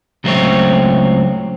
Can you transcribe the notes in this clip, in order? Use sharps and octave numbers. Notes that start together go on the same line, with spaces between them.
C#2 F#3 G3 A3 C4 C#5